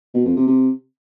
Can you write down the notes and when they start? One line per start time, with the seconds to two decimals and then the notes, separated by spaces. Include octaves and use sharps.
0.14 B2
0.25 F2
0.36 C3
0.47 C3